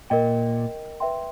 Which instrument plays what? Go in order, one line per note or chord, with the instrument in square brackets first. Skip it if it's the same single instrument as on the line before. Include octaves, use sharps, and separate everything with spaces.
[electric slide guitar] A#2 [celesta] A#4 D#5 G5
[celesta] B4 E5 G5 C6